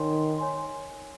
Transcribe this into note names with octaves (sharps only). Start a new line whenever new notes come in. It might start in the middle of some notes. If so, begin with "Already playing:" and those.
Already playing: D#3 C#5 G#5 C6
C#5 G#5 C6